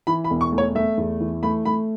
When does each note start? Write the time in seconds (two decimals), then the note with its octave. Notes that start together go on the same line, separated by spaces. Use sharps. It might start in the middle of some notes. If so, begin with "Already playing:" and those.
0.07 E3 B5
0.24 B5
0.30 E1
0.41 C#6
0.53 A3
0.58 C#5
0.75 A3 E5
0.97 E2
1.20 E3
1.43 A3 B5
1.65 A3 B5